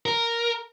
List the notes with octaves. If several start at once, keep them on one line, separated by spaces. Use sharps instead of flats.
A#4